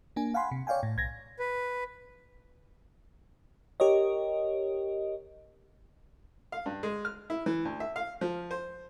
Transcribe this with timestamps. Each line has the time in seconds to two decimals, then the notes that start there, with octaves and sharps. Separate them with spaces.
0.16 A#3 D4 G#5
0.34 F5 F#5 G#5 B5 C6
0.51 C3
0.67 C#5 D5 F5 G5 G#5
0.83 A2
0.97 B1 G#6 A#6
1.39 B4
3.80 G4 A#4 C#5 D#5
6.52 F5
6.66 G2
6.83 G#3
7.05 F6
7.30 E4
7.46 E3
7.65 D2
7.80 E5
7.96 F5
8.21 F3
8.51 C5